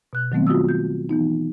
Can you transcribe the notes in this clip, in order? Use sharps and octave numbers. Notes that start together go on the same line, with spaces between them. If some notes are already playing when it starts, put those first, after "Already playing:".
B2 F#6
D#3 F#3 G3 A3 B3 C4
F4 F#4 D#6 E6
G6
E3 B3 D#4